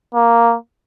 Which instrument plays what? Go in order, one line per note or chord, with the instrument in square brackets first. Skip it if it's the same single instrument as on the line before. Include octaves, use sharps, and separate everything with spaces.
[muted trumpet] A#3